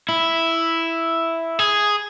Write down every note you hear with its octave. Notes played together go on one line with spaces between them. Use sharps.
E4
G#4